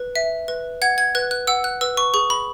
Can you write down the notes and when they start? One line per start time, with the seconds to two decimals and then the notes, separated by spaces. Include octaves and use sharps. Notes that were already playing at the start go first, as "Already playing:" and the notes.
Already playing: B4
0.16 E5
0.48 B4
0.82 F#5 G#6
0.98 G#6
1.15 B4 F#6
1.31 F#6
1.47 F#5 E6
1.64 F#6
1.81 B4 E6
1.97 C#6
2.14 G#4 C#6
2.30 B5